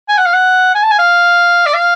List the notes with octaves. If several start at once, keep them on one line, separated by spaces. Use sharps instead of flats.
G#5
F#5
F5
F#5
G#5
A5
G#5
F5
D5
F5